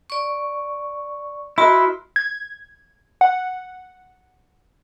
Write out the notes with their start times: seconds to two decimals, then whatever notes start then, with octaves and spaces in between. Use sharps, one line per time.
0.10 D5 C#6
1.58 E4 F#4 A#4 D#5 B5 C6
2.16 G#6
3.21 F#5